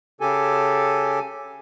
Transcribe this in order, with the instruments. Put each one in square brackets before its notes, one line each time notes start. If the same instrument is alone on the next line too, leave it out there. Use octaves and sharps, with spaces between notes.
[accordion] C#3 G4 A4 G#5